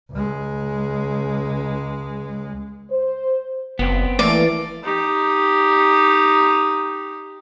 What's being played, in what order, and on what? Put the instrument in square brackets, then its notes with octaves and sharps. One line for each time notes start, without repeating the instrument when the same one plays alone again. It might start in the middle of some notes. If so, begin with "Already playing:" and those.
[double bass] C#2 G#3
[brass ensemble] C5
[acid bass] F#1 [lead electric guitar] B3 C4
[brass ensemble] E3 [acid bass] A3 [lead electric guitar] A#3 [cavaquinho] D5
[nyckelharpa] D#4 G4